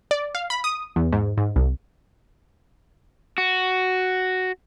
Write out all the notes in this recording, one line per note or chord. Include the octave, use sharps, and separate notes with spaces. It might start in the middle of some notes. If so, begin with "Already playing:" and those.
D5
F5
B5
D#6
E2
G#2
G#2
C2
F#4